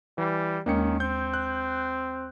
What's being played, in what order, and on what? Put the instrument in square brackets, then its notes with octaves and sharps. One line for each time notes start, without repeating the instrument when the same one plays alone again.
[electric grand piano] E3 [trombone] G3
[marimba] D#2 G#3 [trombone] D#3 [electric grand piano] A#3 C#4 C#7
[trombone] C4 [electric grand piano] G6
[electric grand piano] F#6